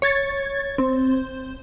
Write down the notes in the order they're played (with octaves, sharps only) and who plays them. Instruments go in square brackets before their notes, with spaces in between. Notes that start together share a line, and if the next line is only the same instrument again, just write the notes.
[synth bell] C#5 G#6 A6
C4